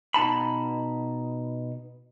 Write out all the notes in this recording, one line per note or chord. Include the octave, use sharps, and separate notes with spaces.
B2 D#4 A5 B5